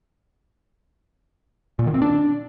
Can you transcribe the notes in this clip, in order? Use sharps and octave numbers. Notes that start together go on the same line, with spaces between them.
A#2
D#3
C4
D4